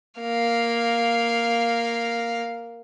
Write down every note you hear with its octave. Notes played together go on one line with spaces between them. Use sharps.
A#3 F5